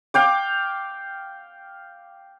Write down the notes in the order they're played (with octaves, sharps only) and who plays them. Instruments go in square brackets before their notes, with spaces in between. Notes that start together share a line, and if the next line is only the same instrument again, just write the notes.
[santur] F5 G5 D6